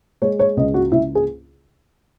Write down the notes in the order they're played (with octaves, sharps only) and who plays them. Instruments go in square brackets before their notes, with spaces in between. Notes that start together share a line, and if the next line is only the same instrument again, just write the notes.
[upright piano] G#3 C#5
C#5
C#2 D#5
F#4
C#2 E4
G#4